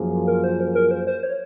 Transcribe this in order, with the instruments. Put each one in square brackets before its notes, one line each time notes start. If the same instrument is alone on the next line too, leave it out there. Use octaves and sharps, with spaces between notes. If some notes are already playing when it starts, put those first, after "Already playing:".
Already playing: [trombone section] F#2 F3 A#3 F4 G#4
[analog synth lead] A#4
C5
A#4
A#4
C5
C5
C#5